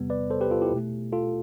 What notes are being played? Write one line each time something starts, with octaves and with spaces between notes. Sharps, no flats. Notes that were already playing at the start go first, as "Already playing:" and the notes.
Already playing: E2 C3 G3 B3
B4 D5
A4 C5
G4 B4
F4 A4
E4 G4
B2 A3
F4 A4